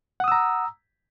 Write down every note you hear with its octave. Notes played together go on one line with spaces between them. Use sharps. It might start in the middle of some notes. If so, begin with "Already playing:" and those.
F#5 A#5 D#6 E6